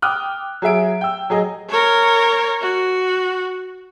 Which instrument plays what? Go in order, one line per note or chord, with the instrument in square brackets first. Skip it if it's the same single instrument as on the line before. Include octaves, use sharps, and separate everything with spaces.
[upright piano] G5 D6 D#6 F6 F#6
F#3 G#4 E5 D7
G5 E6
F#3 G#4 D#5
[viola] A#4 C#5
F#4